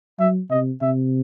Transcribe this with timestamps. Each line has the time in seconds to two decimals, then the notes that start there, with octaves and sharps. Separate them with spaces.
0.19 F#3 E5
0.50 C3 D#5
0.81 C3 E5